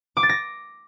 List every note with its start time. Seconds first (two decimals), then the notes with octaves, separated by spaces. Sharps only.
0.17 D6
0.23 A6
0.29 A#6